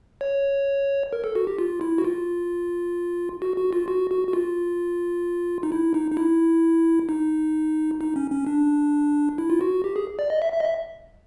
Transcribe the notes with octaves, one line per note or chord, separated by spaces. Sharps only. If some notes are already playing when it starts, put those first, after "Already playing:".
C#5
A#4
A4
F#4
G4
F4
E4
F#4
F4
F#4
F#4
F4
F#4
F#4
F#4
F4
D#4
E4
D#4
D#4
E4
D#4
D#4
C#4
C#4
D4
E4
F4
F#4
G4
G#4
D5
D#5
E5
E5
D#5
E5